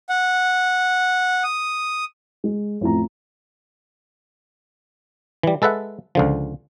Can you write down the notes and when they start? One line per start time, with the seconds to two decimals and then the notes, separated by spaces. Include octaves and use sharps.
0.09 F#5
1.44 D#6
2.44 G#3
2.81 A1 F2 A#5
5.43 E3 G3
5.62 G#3 A4 B4 E5 F#5
6.15 C#2 D3 F3